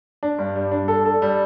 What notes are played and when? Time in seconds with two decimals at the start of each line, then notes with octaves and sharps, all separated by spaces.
0.23 D4
0.38 G2
0.56 G3
0.72 D4
0.88 A4
1.05 A4
1.22 G3